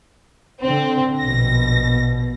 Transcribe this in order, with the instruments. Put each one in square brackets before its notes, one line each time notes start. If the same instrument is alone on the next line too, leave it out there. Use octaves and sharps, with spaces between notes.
[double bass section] D3 [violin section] C4
[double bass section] A#1 B2 [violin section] A#6